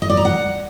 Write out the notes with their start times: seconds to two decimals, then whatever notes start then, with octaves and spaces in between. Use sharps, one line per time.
0.02 D#5
0.10 D5
0.17 A#5
0.25 F#5